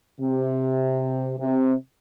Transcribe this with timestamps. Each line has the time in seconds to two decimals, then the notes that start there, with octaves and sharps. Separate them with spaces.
0.21 C3
1.39 C3